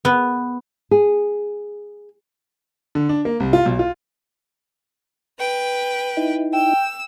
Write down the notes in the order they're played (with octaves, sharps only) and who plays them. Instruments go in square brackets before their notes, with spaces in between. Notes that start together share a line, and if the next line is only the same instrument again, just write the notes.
[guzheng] B3
[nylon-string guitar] G#4
[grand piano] D3
D4
A#3
C2
F4
B1
F4
[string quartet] B4 G5
[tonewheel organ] D#4 E4
[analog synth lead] G5 [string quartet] E6